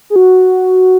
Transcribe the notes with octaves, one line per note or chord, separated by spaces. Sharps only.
G#4
F#4